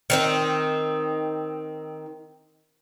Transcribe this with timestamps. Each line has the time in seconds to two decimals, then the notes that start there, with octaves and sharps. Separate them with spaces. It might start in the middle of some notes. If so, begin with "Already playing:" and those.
0.10 D#3 C4 D#4